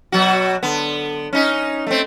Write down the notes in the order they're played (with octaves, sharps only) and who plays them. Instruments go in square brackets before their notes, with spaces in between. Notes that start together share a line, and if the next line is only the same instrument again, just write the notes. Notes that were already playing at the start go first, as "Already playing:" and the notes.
[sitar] B2 F#3 F#4
D3 B3
C#4 D#4
A3 C4